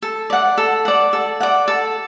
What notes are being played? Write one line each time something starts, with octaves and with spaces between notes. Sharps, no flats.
A4
D5 F#5
A4
D5 F#5
A4
D5 F#5
A4